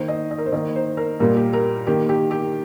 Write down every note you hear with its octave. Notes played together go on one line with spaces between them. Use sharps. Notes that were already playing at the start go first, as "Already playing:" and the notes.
Already playing: D#3 A#3 C5
D#5
D#5
A#4
C5
D#3 A#3 D#5
C5
A#4
A#2 G3 A#3 A#4
G4
A#4
D#3 A#3 G4
G4
G4